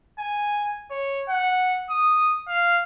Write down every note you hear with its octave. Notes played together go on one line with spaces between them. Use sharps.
G#5
C#5
F#5
D#6
F5